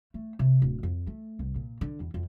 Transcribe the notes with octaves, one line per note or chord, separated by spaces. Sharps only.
A3
C3
D1
F2
A3
C2
A#2
D3
E2
F2